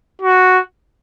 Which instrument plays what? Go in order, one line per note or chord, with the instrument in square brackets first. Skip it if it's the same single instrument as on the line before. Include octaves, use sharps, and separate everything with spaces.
[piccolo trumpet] F#4